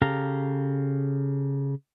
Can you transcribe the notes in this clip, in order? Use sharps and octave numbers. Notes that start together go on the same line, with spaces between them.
C#3 G4 A4 F5 A#5